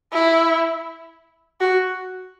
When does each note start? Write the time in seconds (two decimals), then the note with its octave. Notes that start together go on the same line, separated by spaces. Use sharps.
0.13 E4
1.61 F#4